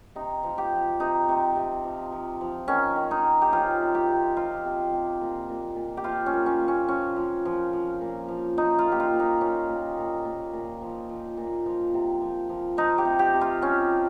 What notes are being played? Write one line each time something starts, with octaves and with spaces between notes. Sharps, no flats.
C3 D#4
F3
G4
F3
C3 D#4
C3
C3
F3
F3
F3
D#3 C#4
D#3
D#4
D#3
G4
F3 F4
C3
G4
C3
C3 F4
C3
C3
A#2
A#2
A#2
G4
F3 F4
C#4
A#2
C#4
A#2
C#4
F3 C#4
F3
F3
F3
A#2
F3
F3 D#4
F4
A#2
G4
F4
A#2
D#4
A#2 C#4
A#2
A#2
A#2
A#2
F3
F3
A#2
F3
C3
F3
F3
F3 D#4
G4
C3
G4
C3
F4
F3 C#4
F3